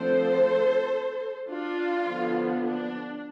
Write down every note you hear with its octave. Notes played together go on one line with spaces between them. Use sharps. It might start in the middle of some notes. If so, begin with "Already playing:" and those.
Already playing: D3 F3 A3 C4 A4 C5
D4 F4
D3 F3 B3 D4
D4